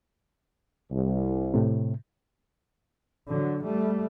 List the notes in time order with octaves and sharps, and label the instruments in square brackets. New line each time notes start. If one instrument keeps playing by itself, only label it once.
[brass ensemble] C2
[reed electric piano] A2 C3
[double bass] D3 F#3
G3 A3